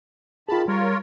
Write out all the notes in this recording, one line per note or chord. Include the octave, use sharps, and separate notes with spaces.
D#3 F4 G#4 A5 B5
G3 F4 A#4 C#5